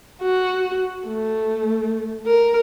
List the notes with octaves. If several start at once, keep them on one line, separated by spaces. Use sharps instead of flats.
F#4
A3
A#4